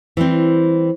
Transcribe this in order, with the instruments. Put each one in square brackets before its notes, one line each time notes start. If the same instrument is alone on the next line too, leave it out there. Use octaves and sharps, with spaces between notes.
[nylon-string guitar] E3 G3 C4